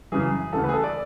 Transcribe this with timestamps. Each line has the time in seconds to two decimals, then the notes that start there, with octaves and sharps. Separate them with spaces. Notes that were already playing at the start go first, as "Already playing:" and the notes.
0.12 F#2 C#3 E3 G#4
0.53 D2 C#3 E3 A4
0.64 B4
0.69 G#4
0.73 A4
0.84 D5